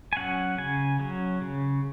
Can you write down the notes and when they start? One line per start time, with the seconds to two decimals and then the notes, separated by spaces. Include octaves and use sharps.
0.13 G#5
0.17 F#3 C#4 F#5
0.58 C#3 G#5
1.00 F#3 C#4
1.41 C#3